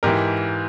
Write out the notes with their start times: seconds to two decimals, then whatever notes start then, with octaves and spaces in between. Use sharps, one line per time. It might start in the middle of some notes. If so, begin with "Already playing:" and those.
0.03 G#2 E3 G4 A#4